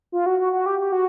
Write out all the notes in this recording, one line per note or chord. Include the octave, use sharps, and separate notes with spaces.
F4
F#4
F#4
F#4
G4
G4
F#4